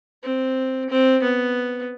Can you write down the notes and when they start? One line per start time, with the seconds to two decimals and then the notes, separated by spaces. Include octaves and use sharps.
0.23 C4
0.90 C4
1.23 B3